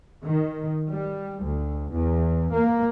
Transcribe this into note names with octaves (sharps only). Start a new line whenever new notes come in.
D#3
G3
D2
E2
A#3